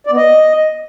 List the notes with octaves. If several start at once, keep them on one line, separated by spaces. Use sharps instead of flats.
D5
B3
D#5